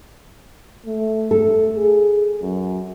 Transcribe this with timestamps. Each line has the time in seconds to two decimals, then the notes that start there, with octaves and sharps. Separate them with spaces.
0.86 A3
1.31 A4
1.76 G#4
2.42 F#2